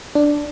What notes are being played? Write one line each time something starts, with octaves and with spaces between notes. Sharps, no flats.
D4